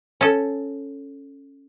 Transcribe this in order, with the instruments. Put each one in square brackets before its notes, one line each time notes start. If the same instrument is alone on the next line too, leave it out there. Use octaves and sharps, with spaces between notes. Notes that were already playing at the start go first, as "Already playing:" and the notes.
[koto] C#4 A4